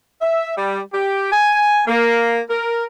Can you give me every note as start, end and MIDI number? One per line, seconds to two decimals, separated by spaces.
0.21 0.54 76
0.56 0.80 55
0.93 1.27 67
1.32 1.82 80
1.87 2.39 58
2.50 2.85 70